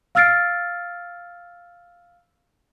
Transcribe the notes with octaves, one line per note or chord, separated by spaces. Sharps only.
F5 E6 F6 A6 C7 D7